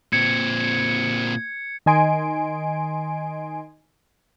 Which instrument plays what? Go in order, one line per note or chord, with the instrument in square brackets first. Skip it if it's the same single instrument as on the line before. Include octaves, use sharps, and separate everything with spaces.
[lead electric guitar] A#2 C4 [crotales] G#6 C#7
[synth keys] D#3 D#5 G#5 C6 D7